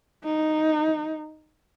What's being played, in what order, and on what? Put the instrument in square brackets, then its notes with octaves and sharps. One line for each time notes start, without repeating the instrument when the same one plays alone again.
[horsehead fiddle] D#4